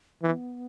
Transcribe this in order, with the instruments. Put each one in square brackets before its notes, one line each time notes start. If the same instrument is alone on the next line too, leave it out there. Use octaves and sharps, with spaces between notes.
[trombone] E3 [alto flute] B3